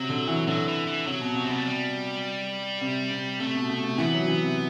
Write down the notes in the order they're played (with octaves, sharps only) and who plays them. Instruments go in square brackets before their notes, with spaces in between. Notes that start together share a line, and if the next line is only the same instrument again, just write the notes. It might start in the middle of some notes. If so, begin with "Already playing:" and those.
Already playing: [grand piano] C3 [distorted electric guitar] F#3
[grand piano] D3
E3
[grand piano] D3 [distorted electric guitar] F#3
[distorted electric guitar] E3
E3
[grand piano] C3 [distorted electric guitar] F#3
[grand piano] B2
C3
[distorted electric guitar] C4
[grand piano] C3 [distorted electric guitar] B3
[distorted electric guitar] A3
G3
[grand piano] C3
C3
[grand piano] C3 [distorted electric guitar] A3
[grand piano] B2
C3
C3
[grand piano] E3 [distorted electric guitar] B3
[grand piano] F#3
E3
C3